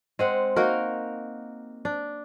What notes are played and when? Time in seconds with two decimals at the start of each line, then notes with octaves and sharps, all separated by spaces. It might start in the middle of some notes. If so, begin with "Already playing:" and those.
0.19 G#3 C4 F#5
0.56 A#3 D#4 F#4 A#4
1.85 D4